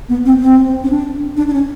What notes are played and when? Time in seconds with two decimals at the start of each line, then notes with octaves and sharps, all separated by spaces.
0.09 B3
0.25 C4
0.41 C4
0.84 C#4
0.89 D4
1.37 D4
1.48 D4
1.53 C#4